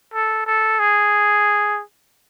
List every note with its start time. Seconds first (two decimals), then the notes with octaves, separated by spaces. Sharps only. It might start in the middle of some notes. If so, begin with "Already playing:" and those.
0.14 A4
0.46 A4
0.79 G#4